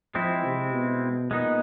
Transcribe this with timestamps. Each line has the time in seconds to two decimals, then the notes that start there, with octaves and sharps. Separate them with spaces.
0.14 F3 G#3 C4 E4
0.44 C3
0.73 B2
1.31 A#2 G#3 B3 D#4